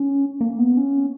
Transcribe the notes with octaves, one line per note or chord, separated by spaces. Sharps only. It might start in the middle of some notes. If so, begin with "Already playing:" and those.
Already playing: C#4
A#3
B3
C#4